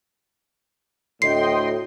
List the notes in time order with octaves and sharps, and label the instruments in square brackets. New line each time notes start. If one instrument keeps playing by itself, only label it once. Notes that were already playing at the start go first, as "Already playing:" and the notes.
[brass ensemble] D2 A2 [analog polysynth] D#5 G5 C6 [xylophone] C7